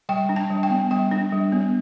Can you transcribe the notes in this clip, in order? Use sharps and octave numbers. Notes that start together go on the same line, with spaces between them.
G3 G5
D4
A5
G3
G5
B3
G3 G5
D4
G3
B3